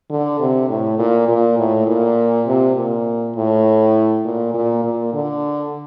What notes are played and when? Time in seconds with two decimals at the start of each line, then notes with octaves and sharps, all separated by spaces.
0.10 D3
0.40 C3
0.69 A2
0.99 A#2
1.28 A#2
1.58 A2
1.88 A#2
2.47 C3
2.76 A#2
3.36 A2
4.25 A#2
4.54 A#2
4.84 A#2
5.14 D3